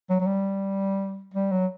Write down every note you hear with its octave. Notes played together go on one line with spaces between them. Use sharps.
F#3
F#3
G3
G3
F#3